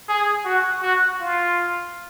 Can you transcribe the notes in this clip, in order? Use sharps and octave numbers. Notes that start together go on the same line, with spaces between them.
G#4
F#4
F#4
F4